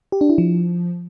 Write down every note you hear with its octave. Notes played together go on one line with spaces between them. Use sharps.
G4
D4
E4
F3